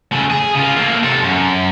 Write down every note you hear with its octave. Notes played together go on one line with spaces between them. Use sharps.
C#3 A3
G#4
C#3 F4
A3 A#3
C3 A4
F#2